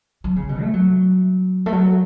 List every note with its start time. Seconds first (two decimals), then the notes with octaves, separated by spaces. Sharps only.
0.24 F#3
0.36 C#3
0.49 B2
0.61 A3
0.73 F#3
1.66 A3
1.72 F#3